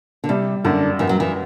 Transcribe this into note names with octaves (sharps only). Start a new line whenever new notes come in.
D3
C3 G3
F#2 D3
F#2 E3
F#3
E3